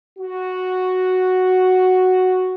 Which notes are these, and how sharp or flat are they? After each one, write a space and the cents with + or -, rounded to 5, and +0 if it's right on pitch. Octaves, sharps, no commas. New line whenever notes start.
F#4 +0